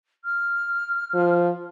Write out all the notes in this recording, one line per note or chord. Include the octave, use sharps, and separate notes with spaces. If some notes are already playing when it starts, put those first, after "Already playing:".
F6
F3